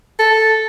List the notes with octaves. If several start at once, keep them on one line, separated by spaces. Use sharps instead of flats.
A4